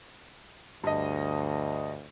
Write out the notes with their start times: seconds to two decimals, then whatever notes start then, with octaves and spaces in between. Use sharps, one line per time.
0.84 D2 G2 D#5